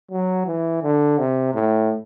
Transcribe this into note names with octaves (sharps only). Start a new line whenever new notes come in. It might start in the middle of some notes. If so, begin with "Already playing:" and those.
F#3
E3
D3
C3
A2